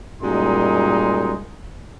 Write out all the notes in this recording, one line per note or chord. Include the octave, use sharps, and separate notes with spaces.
F#2 A#2 G3 G#3 D#4 C6